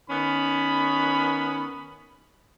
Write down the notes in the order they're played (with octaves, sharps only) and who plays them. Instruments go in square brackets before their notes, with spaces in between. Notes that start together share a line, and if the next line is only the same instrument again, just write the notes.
[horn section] D#3 B3 C#4 B5